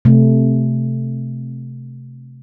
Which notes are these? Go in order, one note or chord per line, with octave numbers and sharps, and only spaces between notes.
C3 A3